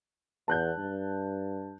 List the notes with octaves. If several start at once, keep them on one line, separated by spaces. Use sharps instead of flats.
E2 A5 F#6 G6
G2